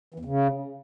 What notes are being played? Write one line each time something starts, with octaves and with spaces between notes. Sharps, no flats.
E3
E2
C#3